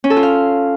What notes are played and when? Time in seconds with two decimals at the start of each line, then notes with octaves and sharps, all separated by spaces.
0.04 C#4
0.10 A4
0.17 F4
0.23 F5